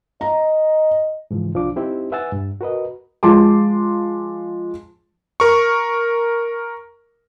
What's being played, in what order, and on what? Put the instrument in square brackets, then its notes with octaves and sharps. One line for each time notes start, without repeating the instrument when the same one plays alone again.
[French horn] D#5 [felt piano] A#5
[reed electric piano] G#2 C#3 E3 F3
C2 F3 D4 D6
C4 D#4 E4 G4 C5
B4 E5 F#5 G#5 E6 A6
G2
F#4 A#4 B4 D#5
[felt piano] F3 G#3 A5 C6 D6
[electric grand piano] A#4 C#6